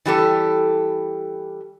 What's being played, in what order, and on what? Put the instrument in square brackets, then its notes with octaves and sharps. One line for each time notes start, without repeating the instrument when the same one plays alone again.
[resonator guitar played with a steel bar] E3 G3 G4 A4